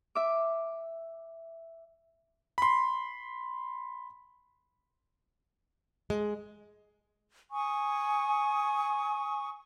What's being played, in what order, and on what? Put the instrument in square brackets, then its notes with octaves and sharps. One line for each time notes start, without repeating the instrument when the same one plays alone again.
[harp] E5 D6
[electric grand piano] B5 C6
[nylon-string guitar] G#3
[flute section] G#5 C#6 D#6